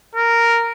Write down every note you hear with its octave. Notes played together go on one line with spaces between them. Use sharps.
A#4